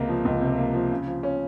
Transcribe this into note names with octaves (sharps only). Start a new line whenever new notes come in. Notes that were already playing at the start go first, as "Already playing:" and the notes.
Already playing: C#2 C3 A#3
F3
C#2
C3
A#3
F3
C#3
F3
C#4